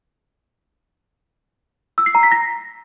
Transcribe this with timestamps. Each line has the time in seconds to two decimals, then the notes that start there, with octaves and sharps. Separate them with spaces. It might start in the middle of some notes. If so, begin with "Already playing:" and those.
1.98 E6
2.06 C7
2.15 A#5
2.23 B6
2.32 A#6